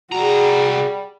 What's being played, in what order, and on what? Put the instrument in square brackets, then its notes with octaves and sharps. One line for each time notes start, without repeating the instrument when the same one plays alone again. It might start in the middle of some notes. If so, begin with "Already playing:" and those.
[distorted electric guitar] C2 A#5 [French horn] G3 [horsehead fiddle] F#4 G#4